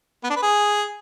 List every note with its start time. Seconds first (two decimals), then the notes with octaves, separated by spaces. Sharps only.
0.24 B3
0.30 D4
0.36 B4
0.42 G#4